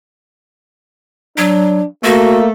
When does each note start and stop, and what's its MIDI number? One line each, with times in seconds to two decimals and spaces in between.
1.38 1.81 54
1.38 1.87 62
2.04 2.51 57
2.04 2.48 58
2.04 2.39 66